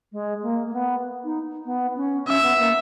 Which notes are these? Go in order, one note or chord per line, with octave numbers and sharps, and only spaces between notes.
G#3
A#3
A#3
B3
D#4
B3
C#4
C#4 E5
B3
A#3